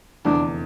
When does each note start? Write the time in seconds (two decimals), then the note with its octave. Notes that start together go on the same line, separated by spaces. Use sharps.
0.25 F1 E2 D3 D4